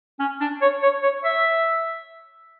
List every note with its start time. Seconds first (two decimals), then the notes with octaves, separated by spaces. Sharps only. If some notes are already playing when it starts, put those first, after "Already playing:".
0.20 C#4
0.41 D4
0.62 C#5
0.82 C#5
1.03 C#5
1.25 E5